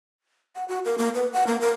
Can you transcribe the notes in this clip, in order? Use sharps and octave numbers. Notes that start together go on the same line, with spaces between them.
F#5
F#4
A#4
A#3
B4
F#5
A#3
A#4